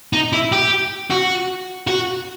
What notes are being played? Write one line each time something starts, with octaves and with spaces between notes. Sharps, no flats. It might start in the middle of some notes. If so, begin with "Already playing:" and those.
D#4
E4
G4
F#4
F#4